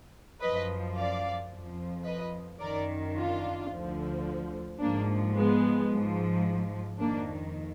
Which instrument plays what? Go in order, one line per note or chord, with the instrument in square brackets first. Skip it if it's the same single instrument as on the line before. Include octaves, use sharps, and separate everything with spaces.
[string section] F#2 F3 B4 D#5
D5 F5
F2 F3
B4 D#5
F#2 D#3 A#4 D5
D4 F4
D2 D3 F3
G#2 F3 A#3 D4
G#3 B3
G#2 F3
F2 D#3 A#3 D4